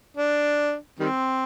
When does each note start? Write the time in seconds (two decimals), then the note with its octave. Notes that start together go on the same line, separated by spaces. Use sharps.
0.17 D4
0.99 D#3 G3 C4